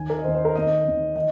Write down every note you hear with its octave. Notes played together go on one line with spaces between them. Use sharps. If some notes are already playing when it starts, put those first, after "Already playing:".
Already playing: D#2 D#3 G#5
A#4
D#5
D#2 D#3 C5
C5
A#4
D#2 D#3 D#5
D#2 D#3
D#3 D#5